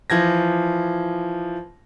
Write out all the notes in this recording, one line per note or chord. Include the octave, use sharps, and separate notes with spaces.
E3 F3 G#6 A#6